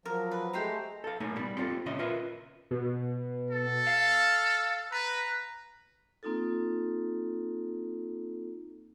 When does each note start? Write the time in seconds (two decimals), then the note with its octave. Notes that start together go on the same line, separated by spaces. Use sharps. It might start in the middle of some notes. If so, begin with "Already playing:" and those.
0.06 F3 F#3 A#4
0.31 B4
0.53 G#3 A3 G4 C5 A#5
1.04 A4 F5
1.20 B1 A2 A3 A#3 D#4 G#5
1.36 G3 B3
1.58 C4 F4 G4 A4
1.86 A#2 C#3 C#4 C5 D#5 E5
1.99 F4 A#4 B4 E5
2.71 B2
3.51 A4
3.87 F5
4.92 B4 A#5
6.23 A#3 C4 D#4 F4 A4